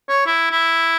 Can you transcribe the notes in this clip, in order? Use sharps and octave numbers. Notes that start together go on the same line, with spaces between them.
C#5
E4
E4